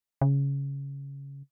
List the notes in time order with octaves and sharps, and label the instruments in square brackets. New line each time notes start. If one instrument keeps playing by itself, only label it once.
[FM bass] C#3